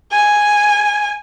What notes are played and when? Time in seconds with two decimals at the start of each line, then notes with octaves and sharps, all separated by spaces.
0.11 G#5